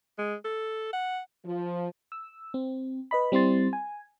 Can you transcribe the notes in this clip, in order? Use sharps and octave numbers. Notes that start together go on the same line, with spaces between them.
G#3
A4
F#5
F3
E6
C4
B4 D#5 B5
G3 C4 E4 C6 A6
G#5